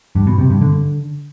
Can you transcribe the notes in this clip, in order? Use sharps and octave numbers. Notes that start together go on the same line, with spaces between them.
G2
B2
C3
G2
D3